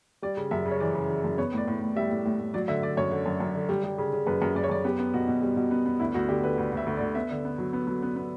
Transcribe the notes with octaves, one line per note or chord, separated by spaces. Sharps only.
G3 D5
C#3
F#2 E5
C#3
C#5
E3 D5
C#3
E3
F#2
B3 C#5
A2 D5
A2
A2
G3 E5
A2
A2
A2
F#3 D5
D3 E5
D3 D5
F#2 C#5
D3
F#2
F#2
D3
G3
G3
C#3
C#3
F#2 B4
F#2
F#2 D5
C#5
F#2 D5
B3 G4
B3
B2 F#4
B2
G3
B2
B3
B3
D2 E4
D2 F#4
D3 G4
D3 B4
D2
D2 E5
D2
D5
D2
B3 E5
D3
B3
F#3
B3
F#3
B3
B3